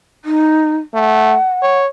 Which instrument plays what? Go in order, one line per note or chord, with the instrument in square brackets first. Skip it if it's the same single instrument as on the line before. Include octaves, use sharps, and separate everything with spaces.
[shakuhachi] D#4
[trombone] A3 [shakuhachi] F#5
[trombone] C#5